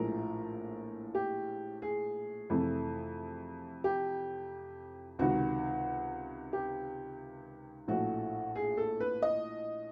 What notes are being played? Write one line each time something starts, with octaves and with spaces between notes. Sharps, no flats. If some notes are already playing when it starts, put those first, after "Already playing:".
Already playing: A#1 A2 F3 G#3 A#4
G4
G#4
F2 C3 E3 A3
G4
C#2 C3 D#3 F#4
G4
A#1 A2 F3 A3 F#4
G#4
A4
B4
D#5